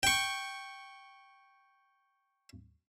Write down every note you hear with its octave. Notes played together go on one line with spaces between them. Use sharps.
G5 C#6